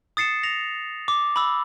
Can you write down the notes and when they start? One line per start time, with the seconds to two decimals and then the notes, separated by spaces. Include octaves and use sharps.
0.17 D#6 A6 C7 C#7 E7
0.43 A#6 F7
1.08 D6
1.36 B5 D6 E6